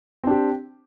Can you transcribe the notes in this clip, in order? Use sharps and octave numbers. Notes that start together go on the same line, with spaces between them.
C4 D4 G4